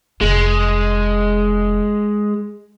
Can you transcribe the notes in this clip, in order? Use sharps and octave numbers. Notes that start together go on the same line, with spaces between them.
F1 G#3